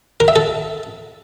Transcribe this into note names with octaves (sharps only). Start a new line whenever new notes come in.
A#4
E5
A4